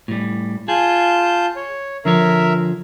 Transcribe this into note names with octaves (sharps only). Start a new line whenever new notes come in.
A2 G3
F4 G#4 A5 G6
C#5
D3 F3 A#4 C#5 E5